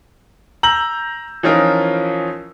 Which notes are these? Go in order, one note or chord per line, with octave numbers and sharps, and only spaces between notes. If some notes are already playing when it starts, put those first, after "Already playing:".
A#5 E6 G6 F#7
E3 F3 C#4 D#4 F4 A#4